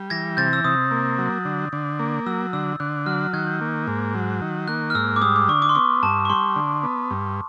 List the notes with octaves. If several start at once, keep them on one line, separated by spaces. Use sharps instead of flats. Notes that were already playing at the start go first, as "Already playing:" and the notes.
Already playing: G3
E3 G#6 A#6
C3 G6 A6
E6
C3 D#6
A#3
F#3
D3
D3
A#3
F#3 E6
D3 E6
D3 F#6
F#3 F6
F6
D#3 F#6 G#6
G6
A#3
G#2
F#3
D#3
A#3 F#6
F6
G#2 E6
D6
G3 D#6
D6
D3 C#6
D6
C6
B3 C#6
G2 A5
C#6
G3 C6
D3
B3
G2